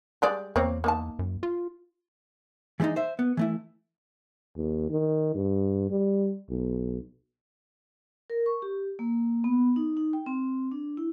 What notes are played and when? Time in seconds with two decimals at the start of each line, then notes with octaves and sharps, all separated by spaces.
0.22 G3 G#3 D5
0.56 E2 A#3 C4 C#5
0.84 A#3 D#4 A5
1.19 F#2
1.43 F4
2.80 E3 G3 G#3 D4 D#4
2.96 C5 E5
3.19 B3
3.37 E3 A3 E4
4.56 D#2
4.90 D#3
5.35 G2
5.90 G3
6.50 B1
8.30 A#4
8.46 C#6
8.62 G4
8.99 A#3
9.44 B3
9.76 D#4
9.97 D#4
10.13 G5
10.26 C4
10.72 D4
10.97 E4